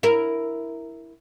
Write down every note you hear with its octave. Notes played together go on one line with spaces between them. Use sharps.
E4 A#4